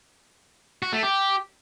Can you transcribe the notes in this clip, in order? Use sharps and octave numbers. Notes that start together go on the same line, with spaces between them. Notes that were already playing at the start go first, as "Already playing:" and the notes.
F#4
A3
G4